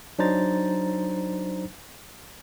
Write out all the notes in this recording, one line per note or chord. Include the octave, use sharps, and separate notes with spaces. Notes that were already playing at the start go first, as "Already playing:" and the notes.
F#3 D4 D#4 C5 A#5 A6